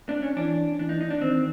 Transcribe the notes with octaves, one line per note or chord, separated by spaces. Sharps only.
D4
C#4
E3 D4
E3 D4
D#4
D#4
D4
D#3 C4